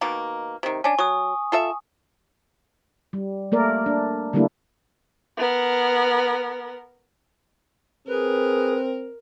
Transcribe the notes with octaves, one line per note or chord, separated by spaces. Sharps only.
B2 D#3 A#3
C3 D#3
C#4 D4 G#5
F#3 C#6 D#6
F4 A4 E5
G3
A3 A#3 A#4 D5
D4
D3 G3 A3 A#3 D4 E4
B3 A#4
C4 G#4 A#4 B4